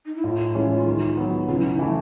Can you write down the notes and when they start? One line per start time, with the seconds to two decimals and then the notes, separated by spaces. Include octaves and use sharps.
0.05 D#4
0.16 E4
0.24 A2 F4
0.55 E3 G#3 C#4 E4
0.87 D#3
1.17 F#3 B3
1.48 C#3 F4
1.56 E4
1.65 D#4
1.72 E4
1.79 E3 A3